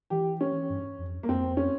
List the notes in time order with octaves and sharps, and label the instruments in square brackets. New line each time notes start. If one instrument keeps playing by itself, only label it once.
[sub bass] E3 [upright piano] G4
[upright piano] C#4
[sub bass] G2
F2
[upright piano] A#3
[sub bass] F2 [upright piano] C4
[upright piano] C#4